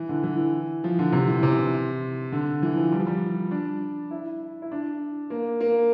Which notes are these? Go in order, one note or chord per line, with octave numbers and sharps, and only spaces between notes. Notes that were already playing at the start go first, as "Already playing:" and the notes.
Already playing: E3
D3
E3
F3
D3
C3
E3
C3
D3
E3
F3
G3
F3
G3
D4
E4
E4
D4
A#3
A#3